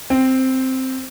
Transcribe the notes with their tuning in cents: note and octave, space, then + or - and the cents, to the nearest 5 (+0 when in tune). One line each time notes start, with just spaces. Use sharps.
C4 +0 G5 +0